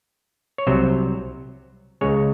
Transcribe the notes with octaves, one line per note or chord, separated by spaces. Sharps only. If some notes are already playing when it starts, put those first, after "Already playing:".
C#5
C2 C3 F#3 C5
C#2 C#3 G#3 C#5